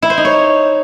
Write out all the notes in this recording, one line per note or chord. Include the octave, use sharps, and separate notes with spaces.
E4
C5
D#4
C#5